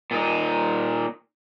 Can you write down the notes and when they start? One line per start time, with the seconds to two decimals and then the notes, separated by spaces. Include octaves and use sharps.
0.11 A#2 D#4